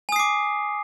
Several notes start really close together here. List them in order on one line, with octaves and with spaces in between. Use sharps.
G#5 D#6 C7 D6